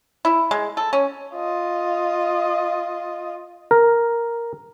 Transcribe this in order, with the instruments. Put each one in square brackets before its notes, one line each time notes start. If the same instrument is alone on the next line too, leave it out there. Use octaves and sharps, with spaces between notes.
[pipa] E4
G#3
A4
C#4
[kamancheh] F4 D#5
[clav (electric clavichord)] A#4